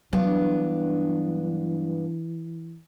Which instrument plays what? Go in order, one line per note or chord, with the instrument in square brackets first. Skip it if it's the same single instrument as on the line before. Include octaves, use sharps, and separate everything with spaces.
[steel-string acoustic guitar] G2 B3 D4 [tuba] E3 [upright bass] F#3